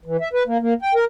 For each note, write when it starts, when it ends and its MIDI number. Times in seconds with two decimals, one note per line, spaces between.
0.05 0.17 52
0.21 0.29 76
0.33 0.43 71
0.47 0.58 58
0.61 0.74 58
0.82 0.94 79
0.95 1.05 70